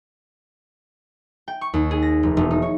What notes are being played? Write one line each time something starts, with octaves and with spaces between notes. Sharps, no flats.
G5
C#6
D#2
G#4
A#6
F1
E1
D#4
C#5